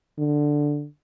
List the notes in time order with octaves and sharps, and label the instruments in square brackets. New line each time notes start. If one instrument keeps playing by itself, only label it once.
[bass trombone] D3